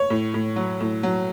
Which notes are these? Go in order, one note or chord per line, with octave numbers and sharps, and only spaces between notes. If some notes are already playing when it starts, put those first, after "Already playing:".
Already playing: C#5
A2
A2
F#3
A2
F#3